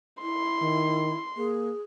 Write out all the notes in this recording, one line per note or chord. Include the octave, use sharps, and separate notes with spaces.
E4 C6
D#3
A#3 G#4